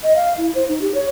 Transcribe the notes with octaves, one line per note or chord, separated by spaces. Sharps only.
D#5
F5
E4
C5
D#4
G4
C#5